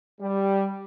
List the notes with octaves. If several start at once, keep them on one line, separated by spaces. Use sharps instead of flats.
G3